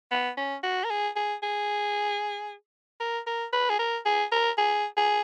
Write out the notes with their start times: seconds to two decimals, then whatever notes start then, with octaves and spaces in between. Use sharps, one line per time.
0.11 B3
0.37 C#4
0.63 F#4
0.84 A#4
0.90 G#4
1.16 G#4
1.43 G#4
3.00 A#4
3.27 A#4
3.53 B4
3.70 G#4
3.79 A#4
4.05 G#4
4.32 A#4
4.58 G#4
4.97 G#4